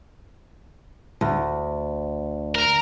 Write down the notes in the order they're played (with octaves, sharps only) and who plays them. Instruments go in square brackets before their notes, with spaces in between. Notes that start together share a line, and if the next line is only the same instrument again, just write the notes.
[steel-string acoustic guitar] D2
[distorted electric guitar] A#4